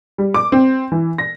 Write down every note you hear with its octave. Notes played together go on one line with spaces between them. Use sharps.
G3
D6
C4
E3
A#6